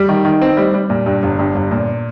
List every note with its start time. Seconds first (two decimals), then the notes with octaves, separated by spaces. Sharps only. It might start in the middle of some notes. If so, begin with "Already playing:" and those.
Already playing: G3
0.09 D#3
0.25 D#3
0.42 C4
0.57 G3
0.74 G3
0.90 A#2
1.06 G2
1.23 G1
1.39 G2
1.55 G1
1.71 A#2